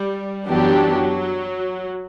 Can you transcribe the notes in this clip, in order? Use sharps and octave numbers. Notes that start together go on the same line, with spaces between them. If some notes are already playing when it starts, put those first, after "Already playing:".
Already playing: G3
F#2 E3 F#3 B3 D4 G4